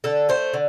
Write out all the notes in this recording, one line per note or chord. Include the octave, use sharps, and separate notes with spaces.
D3 A4
A3 C5
D3